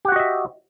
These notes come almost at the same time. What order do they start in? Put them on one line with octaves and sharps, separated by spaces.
G4 F#5 F#4 D#5 E5